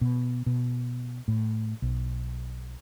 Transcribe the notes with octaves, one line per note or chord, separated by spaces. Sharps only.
B2
B2
A2
B1